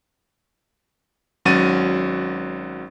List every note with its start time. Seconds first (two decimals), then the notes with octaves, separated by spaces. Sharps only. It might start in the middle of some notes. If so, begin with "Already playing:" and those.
1.45 G#1 F#3 C#4 F#4 A6 D#7